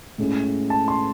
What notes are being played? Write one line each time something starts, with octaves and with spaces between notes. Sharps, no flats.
A2 G#3 C#4
A5
C6